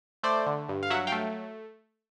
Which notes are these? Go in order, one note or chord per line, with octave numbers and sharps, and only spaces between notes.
A3 C5 D5
D3
G2
F5
F#3 E5 F#5
F5 G5
A3